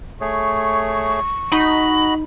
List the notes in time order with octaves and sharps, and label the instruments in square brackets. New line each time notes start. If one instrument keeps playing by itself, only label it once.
[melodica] A3 G#4 C#5 [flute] C#6
[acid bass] D#4 [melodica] F#4 D#5 [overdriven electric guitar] B5